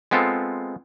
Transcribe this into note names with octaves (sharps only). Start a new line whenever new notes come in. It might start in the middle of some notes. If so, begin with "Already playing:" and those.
G#3 B3 C4 F4 A4